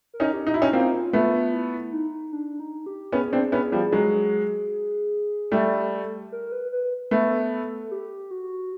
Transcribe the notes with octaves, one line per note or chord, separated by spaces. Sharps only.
A#4
C#4 D#4
G4
D#4
E4 F#4
C#4 D#4
A#3 C4 F4
A3 B3
E4
D#4
D4
D#4
G4
B3 C#4 G#4
C4 D4
B3 C#4
F3 G3
F#3 G#3
G3 A3 A4
A#4
B4
B4
A3 B3 A4
G4
F#4